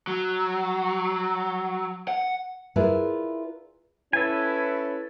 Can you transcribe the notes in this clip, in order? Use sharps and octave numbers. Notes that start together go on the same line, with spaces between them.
F#3
F#5
E4 F4 G#4 A#4 B4 D5
C#4 E4 A4 B4 G#5